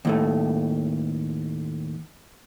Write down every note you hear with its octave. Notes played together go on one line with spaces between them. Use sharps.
D#2 A2 A3